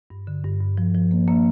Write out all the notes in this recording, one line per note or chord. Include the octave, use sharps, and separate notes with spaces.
G2
D3
G2
G2
F3
F3
A#3
A#3